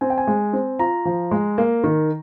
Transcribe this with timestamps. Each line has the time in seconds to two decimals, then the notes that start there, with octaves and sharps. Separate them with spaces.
0.01 C4 G#5
0.10 G5
0.18 G#5
0.27 G#3
0.53 C4
0.79 F4 A#5
1.05 F3
1.31 G#3
1.58 A#3
1.84 D#3